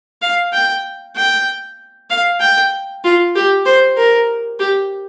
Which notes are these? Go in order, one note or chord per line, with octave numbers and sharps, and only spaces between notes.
F5
G5
G5
F5
G5
F4
G4
C5
A#4
G4